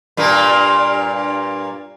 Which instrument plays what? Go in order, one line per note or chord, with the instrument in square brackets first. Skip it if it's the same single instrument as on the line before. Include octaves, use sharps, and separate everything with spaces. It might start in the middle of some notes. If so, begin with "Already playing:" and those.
[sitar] G2 A#2 A#3